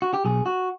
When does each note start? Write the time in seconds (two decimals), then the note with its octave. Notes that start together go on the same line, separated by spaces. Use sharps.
0.02 F#4
0.14 G4
0.25 B1 G#4
0.46 F#4